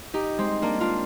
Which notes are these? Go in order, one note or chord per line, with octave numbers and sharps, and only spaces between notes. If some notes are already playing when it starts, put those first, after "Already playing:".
D#4 G4
G#3 C4
A#3 D4
D4 F4